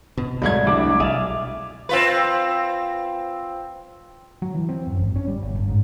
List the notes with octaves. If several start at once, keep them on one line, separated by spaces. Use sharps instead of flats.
B2
C2 F#3 G#3 A3 G#6
G3 D4 E4 D6
B1 G#4 D5 E5 F5
C4 F4 B4
F#3
E3
C4
F#2
G#1
C#4
G3
G1
G1
G#2